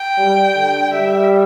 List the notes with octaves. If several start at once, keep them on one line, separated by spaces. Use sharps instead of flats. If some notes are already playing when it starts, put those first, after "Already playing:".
Already playing: G5
G3
D3
G3 E5